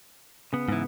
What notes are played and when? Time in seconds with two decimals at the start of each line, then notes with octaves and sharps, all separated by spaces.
0.53 C#3 B3
0.69 G#2 E3